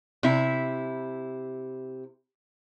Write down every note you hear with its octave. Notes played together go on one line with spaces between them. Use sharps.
C3 E4